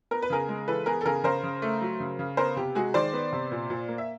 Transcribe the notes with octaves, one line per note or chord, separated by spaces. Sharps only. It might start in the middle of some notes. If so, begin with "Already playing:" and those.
B3 A#4
B4
C#3 G#4 A#4
G#3
E3 A4 B4
B3 G#4 A#4
A4
C#3 G#4 A#4
C#3 A#4 C5
C#3
A3
F#3
C#3
C#3
B3 A#4 C5
C3 G4
G#3 F#4 G#4
D#3 C5 D5
B3
C3
A#2
A#2
A#3
E5